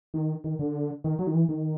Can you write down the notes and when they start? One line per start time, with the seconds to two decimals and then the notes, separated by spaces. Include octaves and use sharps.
0.14 D#3
0.44 D#3
0.59 D3
1.04 D#3
1.19 F#3
1.27 D#3
1.34 E3
1.49 D#3